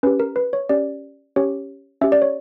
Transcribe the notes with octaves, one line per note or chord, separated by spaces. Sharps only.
C#4 G4 B4
A#4
B4
C#5
C#4 G4 D5
C#4 G4 C#5
C#4 G4 E5
D5
C#5